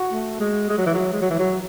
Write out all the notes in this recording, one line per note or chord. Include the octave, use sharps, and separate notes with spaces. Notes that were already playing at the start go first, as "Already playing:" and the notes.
Already playing: F#4
A3
G#3
G#3
F#3
E3
F#3
G#3
F#3
E3
F#3